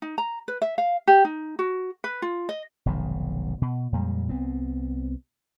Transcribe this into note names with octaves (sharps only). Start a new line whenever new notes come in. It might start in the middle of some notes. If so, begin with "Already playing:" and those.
D#4
A#5
B4
E5
F5
G4
D#4
F#4
B4
F4
D#5
F1 B1 G#2 D#3
B2
F2 A#2 G3 G#3
C2 B3 C4